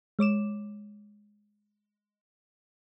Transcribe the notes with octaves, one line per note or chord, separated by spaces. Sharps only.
G#3 C#5 D6 E7